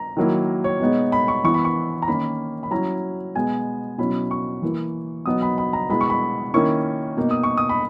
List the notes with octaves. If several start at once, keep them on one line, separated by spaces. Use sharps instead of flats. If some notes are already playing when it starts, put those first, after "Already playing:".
Already playing: A#5
D#3 F#3 A#3 E4
C#5
B2 G#3 B3 D#4
B5
C#6
E3 B3 E4 C#6
B5
C#6
A#5
D#3 A#3 C#4 B5
B5
F#3 C#4 E4 A#5
B2 G#3 B3 G#5
B2 F#3 C#4 E4 B5
C#6
E3 A#3 E4
B2 F#3 B3 D#4 D#6
B5
B5
A#5
B2 G#3 B3 E4 B5
C#6
B5
D#3 A#3 C#4 E4 C#6
B2 A#3 D#4
D#6
C#6
D#6
B5